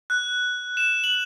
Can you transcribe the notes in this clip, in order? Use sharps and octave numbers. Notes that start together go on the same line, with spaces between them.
F#6
E7
F#7